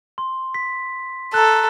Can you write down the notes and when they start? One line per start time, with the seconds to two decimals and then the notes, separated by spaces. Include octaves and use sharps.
0.18 C6
0.54 B6
1.34 A4 A#5 F#6